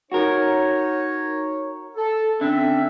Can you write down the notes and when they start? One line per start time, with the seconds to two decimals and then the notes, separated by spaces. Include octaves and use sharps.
0.12 D#4 F#4 A#4 C#5
1.97 A4
2.41 D3 C4 C#4 E5